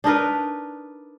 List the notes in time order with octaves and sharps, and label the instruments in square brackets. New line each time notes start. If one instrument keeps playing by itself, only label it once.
[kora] D4 D#4 A#4 B4